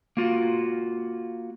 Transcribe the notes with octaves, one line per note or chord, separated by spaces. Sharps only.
A#3 F4 F#4